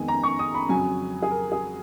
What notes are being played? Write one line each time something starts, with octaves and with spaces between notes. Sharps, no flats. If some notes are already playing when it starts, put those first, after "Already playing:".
Already playing: F2 D#3 G#3 B3 G#5
A#5
C#6
D#6
B5
F2 C#3 F#3 G#5
G#4
A#4
G#4